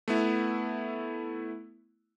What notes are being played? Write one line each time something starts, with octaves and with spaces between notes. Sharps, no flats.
A3 B3 E4